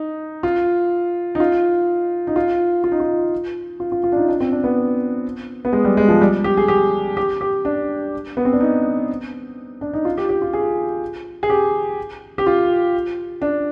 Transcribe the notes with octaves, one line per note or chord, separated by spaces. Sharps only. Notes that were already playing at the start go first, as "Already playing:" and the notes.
Already playing: D#4
F4
D#4
F4
D#4
F4
F4
D#4
F4
F4
F4
F4
D4
D#4
D4
C4
D4
B3
B3
G#3
G3
G#3
F3
G3
G4
G#4
G4
G4
G4
D4
B3
C4
D4
D#4
D4
D#4
F4
G4
G4
F4
G#4
G#4
G4
G4
F4
D4